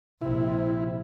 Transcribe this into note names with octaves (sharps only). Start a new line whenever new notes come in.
A#1 C3 E4